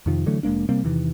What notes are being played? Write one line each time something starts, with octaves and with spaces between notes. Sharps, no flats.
F2 C3 D#3 F3
D3 E3 F#3 A3
F1 G#3 A#3 D4
C3 G3 A#3 C4
E2 C3 D#3 E3